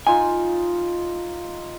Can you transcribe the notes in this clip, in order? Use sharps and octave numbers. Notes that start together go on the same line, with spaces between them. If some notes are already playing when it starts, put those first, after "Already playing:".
D#4 F4 G#5